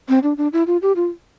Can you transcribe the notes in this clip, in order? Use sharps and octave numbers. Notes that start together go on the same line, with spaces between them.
C4
D4
D4
E4
F4
G4
F4